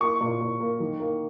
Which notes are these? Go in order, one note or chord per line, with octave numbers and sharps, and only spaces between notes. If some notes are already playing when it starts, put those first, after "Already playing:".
A#3 C#6
A#2
A#2
A#3
D#3
A#3